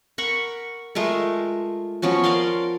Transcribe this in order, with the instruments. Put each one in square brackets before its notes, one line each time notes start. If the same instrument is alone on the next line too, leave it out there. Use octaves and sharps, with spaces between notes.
[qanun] A#4 F#5 B5 C#6
G#3 A3 F4 A#4
F3 B3 C#4 F#4
A#4 D5 F5 C6